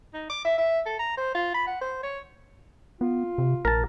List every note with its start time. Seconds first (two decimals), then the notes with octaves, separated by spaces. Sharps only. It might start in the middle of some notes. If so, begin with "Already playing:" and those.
0.13 D#4
0.30 D6
0.45 E5
0.58 E5
0.86 A4
0.99 A#5
1.17 C5
1.35 F4
1.54 B5
1.67 F#5
1.81 C5
2.03 C#5
3.01 B3 F4
3.38 C3
3.65 A#1 A#4 A5